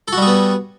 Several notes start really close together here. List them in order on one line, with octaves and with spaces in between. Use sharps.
A4 F#4 G3 G#4 B3